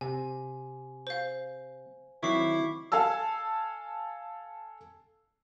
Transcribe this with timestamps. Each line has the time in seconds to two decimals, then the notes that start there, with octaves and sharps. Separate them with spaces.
0.01 C3 G#5
1.07 C5 F5
2.23 D#3 F#3 C4 E4 C#6 D6 C7
2.92 A4 F5 G#5 A5 E6